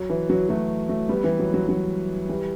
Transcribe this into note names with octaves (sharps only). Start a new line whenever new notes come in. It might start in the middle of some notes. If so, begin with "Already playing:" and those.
Already playing: F#3
E3
F#3
F#3 A3
F#3 A3
G3 B3
E3 G3
F#3
F#3
F#3
E3 G3